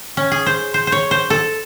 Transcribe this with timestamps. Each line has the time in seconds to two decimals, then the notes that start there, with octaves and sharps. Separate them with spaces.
0.17 C#4
0.32 G#4
0.46 C5
0.74 C5
0.87 C5
0.92 C#5
1.11 C5
1.30 A4